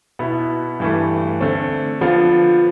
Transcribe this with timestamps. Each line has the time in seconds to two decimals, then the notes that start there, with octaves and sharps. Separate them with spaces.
0.19 B2 B3 E4
0.80 G2 E3 A3
1.40 D3 A3 C4
2.01 D3 F3 B3 F4